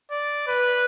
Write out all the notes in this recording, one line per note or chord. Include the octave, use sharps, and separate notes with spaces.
D5
B4